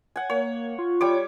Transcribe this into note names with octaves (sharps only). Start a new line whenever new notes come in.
F#5 G#5
A#3 C#5
F4
G3 C#5 D6